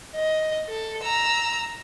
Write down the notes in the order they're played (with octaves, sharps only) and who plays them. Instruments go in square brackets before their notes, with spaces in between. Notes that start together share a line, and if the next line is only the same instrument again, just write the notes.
[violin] D#5
A4
A#5 E6